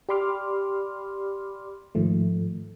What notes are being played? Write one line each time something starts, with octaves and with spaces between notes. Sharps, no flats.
G4 D5 B5 C6 D6 F6
G#2 D#3 F3 A3